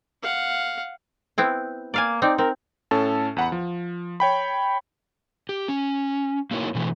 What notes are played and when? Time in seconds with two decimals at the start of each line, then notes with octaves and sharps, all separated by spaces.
0.23 F5 F#5
1.38 B3 C4 E4
1.94 A#3 D5 F5 G#5
2.22 C4 D#4 D5
2.38 C4 A#4
2.91 A2 C#4 A4 A5
3.37 E2 F#5 B5
3.52 F3
4.20 C#5 G5 B5
5.49 G4
5.68 C#4
6.51 A#3 D#4 E4 F#4 A#4 C#5
6.75 B2 E3 A3